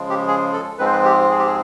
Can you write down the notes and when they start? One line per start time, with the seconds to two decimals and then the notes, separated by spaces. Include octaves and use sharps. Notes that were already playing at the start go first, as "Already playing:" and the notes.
Already playing: C#3 F3 G#3
0.10 G4
0.28 G#4
0.53 A4
0.78 G#2 F3 G#3 C4 B4
0.86 C5
0.92 B4
1.05 G4
1.30 G#4
1.39 G4
1.46 G#4